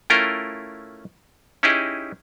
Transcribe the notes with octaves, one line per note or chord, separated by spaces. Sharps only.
A3 C#4 E4 F4 A#4 G5
C#4 D#4 E4 G4 G#4 D#5